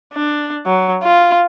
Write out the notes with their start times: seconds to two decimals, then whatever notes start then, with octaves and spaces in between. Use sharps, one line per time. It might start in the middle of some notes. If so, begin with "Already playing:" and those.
0.13 D4
0.66 F#3
1.03 F4